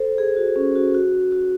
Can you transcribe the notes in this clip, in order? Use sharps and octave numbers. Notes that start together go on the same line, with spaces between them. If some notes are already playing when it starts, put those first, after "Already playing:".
Already playing: A4 C5
G#4
F#4
C#4
F#4
F#4
F#4